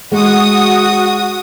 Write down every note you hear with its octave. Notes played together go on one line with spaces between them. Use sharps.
G#3 F#4 D#6